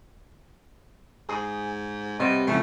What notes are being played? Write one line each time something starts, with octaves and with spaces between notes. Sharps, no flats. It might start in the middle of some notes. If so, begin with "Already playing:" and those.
G#2 G#4
C3 G3 B3 D#5
C2 C#3 F3 A3